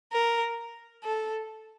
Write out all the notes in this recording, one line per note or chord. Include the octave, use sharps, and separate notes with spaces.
A#4
A4